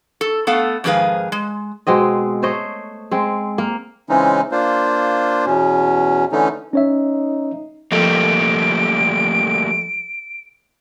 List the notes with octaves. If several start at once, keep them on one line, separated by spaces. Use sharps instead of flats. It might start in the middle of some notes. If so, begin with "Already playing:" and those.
A4
A3 B3 A4 F5
F2 G#2 D#3 G#4 B4 F5
G#3
B2 G#3 C4 D#5
A3 C5 C#5 D#5
G#3 C4
A#3
C#3 E3 G#3 C4 C#4 D#4
A#3 D4 F4 C5
E2 B2 C#4
D3 E3 A3 C#4 D#4
C#4 D#4 C#5 E5
F2 G3 A3 A#3 D7